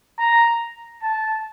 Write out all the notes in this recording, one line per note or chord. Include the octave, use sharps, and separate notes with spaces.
A#5
A5